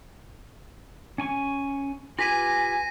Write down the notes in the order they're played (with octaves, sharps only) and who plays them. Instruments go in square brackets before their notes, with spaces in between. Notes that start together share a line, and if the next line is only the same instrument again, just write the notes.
[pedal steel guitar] C#4 G#5 C#6
[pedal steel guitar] F4 G4 B4 [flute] G#5 [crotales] A#6 B6 D#7